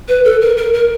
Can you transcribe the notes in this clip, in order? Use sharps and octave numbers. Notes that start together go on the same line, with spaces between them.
B4
A4
A#4
A#4
A#4